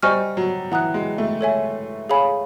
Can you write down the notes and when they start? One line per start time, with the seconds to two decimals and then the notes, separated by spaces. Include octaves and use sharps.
0.03 G3 C5 D#5 G#5 C#6 F6
0.37 F#3
0.72 E3 F#5 A#5 D#6 F#6
0.94 G#3
1.18 A3
1.41 A4 C#5 E5 G#5
2.09 G#4 C#5 F5 G#5 B5